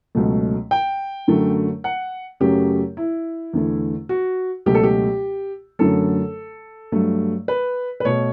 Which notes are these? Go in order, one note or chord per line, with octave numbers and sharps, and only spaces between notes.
C#2 B2 F#3 A3
G5
F#2 D3 F#3 A3
F#5
F#2 C#3 F#3 A3 G4
E4
E2 D3 A3
F#4
C#2 B2 F#3 A3 G4
A4
G4
F#2 D3 F#3 A3 A4
G2 F#3 A3
B4
B4
B2 A3 C#5